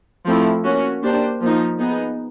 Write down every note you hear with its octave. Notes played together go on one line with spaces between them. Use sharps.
F3 A3 C4 E4
A#3 C#4 F#4
A#3 D4 G4 C5
F3 A#3 D#4
B3 D#4 G#4